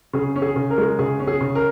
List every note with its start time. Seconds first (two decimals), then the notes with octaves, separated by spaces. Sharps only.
0.13 C#3 G#4
0.36 C#4
0.42 G#4
0.56 C#3
0.70 A#4
0.78 G#3
0.99 C#3 G#4
1.20 C#4
1.27 G#4
1.41 C#3
1.55 A#4